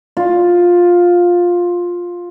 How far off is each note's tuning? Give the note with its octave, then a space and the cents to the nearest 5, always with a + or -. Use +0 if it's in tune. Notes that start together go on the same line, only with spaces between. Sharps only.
F4 +10